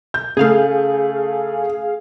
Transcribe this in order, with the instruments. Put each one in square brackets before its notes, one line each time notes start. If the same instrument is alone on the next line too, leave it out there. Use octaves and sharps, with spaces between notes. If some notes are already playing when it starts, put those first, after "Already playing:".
[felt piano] G6
[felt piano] C#3 A3 [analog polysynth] G#4 F5